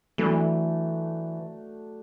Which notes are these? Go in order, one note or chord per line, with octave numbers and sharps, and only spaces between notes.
E3 F#3 A3 D4 F#4